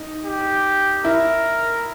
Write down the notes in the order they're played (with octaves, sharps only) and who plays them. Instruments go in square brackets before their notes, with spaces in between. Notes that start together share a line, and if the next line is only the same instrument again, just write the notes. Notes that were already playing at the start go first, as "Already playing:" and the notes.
Already playing: [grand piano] D#4
[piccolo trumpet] G4
[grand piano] E4 [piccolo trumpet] A#4